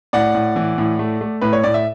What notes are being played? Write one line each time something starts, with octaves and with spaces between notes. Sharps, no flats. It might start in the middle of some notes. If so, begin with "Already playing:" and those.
A2 D5 F#5
A2
E3
A2
A3
A3
A2 B4
C#5
A2 D5
E5